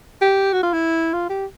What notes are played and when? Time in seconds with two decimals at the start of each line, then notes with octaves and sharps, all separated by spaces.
0.21 G4
0.53 F#4
0.63 F4
0.73 E4
1.14 F4
1.29 G4